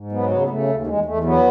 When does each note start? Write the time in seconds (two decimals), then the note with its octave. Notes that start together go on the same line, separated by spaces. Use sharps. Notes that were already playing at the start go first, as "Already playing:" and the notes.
Already playing: G#2
0.12 F#3 B3
0.31 C#3 B3
0.42 B3
0.49 C#3 A3
0.68 D#2
0.87 E2 G#3
1.05 E2 A3
1.24 F#3 B3